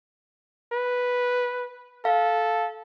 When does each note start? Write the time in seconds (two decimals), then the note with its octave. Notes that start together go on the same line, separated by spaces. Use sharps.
0.73 B4
2.05 A4 F5